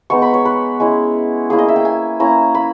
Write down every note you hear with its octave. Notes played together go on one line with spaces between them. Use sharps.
G#3 B3 D#4 C#6
B5
C#5
B4
G#3 C#4 E4
A#3 C#4 E4 G#4
D#5
E5
G5
G#5
A#3 C#4 E4 A#5
B5